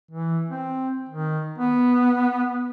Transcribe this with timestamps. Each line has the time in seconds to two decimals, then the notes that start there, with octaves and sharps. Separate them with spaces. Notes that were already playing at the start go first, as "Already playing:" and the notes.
0.11 E3
0.50 C4
1.10 D#3
1.59 B3